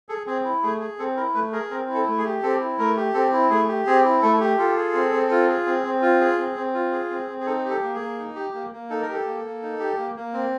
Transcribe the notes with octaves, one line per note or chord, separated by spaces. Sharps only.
G#4 A4
C4 G#4
E4
A3 G#4
G#4
C4 A4
E4 A#4
A3 B4
G#4 A#4
C4 A#4
E4
A4
A3
G#4
G4
C4 A4
E4
A3 A#4
G4
C4 A4
E4
A3 G#4
G4
C4 G#4
E4
A3 A4
G4
F4 A4
G#4
C4
C4
F4
G#4
C4
C4
F4
G#4
C4
C4
F4
G#4
C4
C4
G#4
D#4 A4
G4
A4
A#3
G#4
A#3
D#4
G4
A#3
A#3
D#4 A4
A#4
G4 A4
A#3
A#3
D#4
G4
A#3
A#3
C4